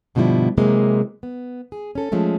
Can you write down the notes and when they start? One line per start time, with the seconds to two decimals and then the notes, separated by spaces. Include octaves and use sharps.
0.15 G2 B2 D3 F3 G3 E4
0.58 C3 E3 F#3 G#3 A#3 C4
1.23 B3
1.72 G#4
1.95 C#4 A4
2.12 F3 G#3 A3 C#4